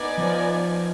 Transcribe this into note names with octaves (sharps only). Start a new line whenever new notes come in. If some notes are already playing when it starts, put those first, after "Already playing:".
Already playing: B3 D#4 B4 D5 G#5
F3